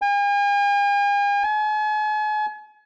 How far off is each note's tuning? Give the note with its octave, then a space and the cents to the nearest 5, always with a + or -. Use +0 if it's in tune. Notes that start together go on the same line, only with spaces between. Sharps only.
G#5 -45
G#5 +40